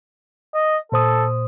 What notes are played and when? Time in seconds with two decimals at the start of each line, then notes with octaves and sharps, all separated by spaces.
0.54 D#5
0.92 A#2 A4 C5 D#6